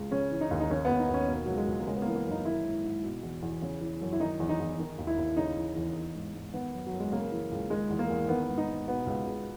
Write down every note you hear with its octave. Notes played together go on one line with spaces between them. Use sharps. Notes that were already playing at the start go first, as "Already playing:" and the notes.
Already playing: C#2
C#3 C#4
E3
D#4
D#2
D#4
D#3 C#4
B3
D#2
D#4
D#2
C#4
B2 A#3
C#2 F#3
G#3
C#2
A#3
C#3 G#3
B3
A#3
E3
A#3
F#2
D#4
D#3 E4
G#2
G#2
B2
E2
E2
C#3
E3
F#2
E4
D#3 D#4
E2
D#4
E2
D#3
D#2
E4
D#2
C#3 D#4
E3
E2
E3
G#2
G#2
D#3 B3
F#2
F#3
F#2
G#3
C#3 A#3
E3
C#2
D#3 G#3
E2
A#3
E2
D#3 B3
G#2
D#4
G#2
B2 B3
C#2
C#2